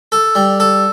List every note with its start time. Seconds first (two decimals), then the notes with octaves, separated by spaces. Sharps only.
0.12 A4
0.35 G3
0.60 A4